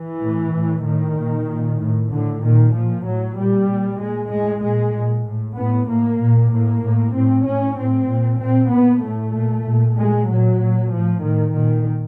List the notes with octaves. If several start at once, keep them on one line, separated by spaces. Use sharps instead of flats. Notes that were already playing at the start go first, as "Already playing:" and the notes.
Already playing: E3
A2
A2
A2 D#3
A#2
A#2
A2
A2 D3
A#2 D#3
A#2 F3
A2 F#3
A#2 G3
A#2
A#2 G#3
A2 G#3
A#2 G#3
A#2
A2
A2 B3
A2 A#3
A#2
A2 A#3
A2
A2 C4
A2 C#4
A2 C4
A#2
A#2 C4
A#2 B3
A2 A3
A#2
A#2
A#2 G#3
A#2 F#3
A#2
A2 F3
A2 D#3
A#2 D#3